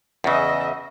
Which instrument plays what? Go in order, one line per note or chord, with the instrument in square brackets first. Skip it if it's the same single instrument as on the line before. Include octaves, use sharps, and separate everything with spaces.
[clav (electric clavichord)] E2 C#3 [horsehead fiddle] D#5 E5